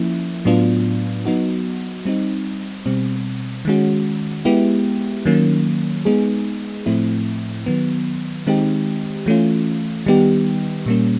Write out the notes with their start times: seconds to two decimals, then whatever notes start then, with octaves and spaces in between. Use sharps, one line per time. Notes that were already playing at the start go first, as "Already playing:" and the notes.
Already playing: F3 A#3 C#4 E4
0.45 A2 F#3 B3 D4 F4
1.25 F#3 B3 D#4 F#4
2.05 G3 C4 D#4
2.86 B2 G3 C4
3.65 D#3 G#3 C#4 F#4
4.45 G#3 B3 E4 G4
5.26 D#3 F#3 A#3 C#4
6.05 G#3 B3 D#4 G#4
6.86 A2 F3 A3 C4 E4
7.66 D#3 F#3 B3
8.47 D#3 G#3 C4 D#4 G4
9.26 E3 A3 C#4 F4
10.06 D#3 G3 B3 D#4 G4
10.86 A#2 G3 A#3 C#4